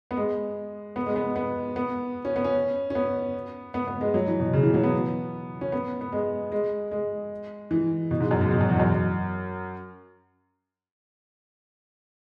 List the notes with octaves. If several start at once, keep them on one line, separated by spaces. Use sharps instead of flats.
B3
G#3
B3
G#3
B3
B3
B3
C#4
B3
C#4
C#4
B3
B3
B3
G#3
F#3
E3
B2
C#3
E3
F#3
B3
C#4
B3
B3
G#3
G#3
G#3
E3
B2
G#2
F#2
G#2
B2
F#2
E2
F#2